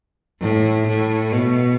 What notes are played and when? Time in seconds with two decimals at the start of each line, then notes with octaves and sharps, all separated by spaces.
0.41 A2
0.87 A2
1.33 B2